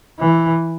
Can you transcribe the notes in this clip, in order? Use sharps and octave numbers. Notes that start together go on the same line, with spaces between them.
E3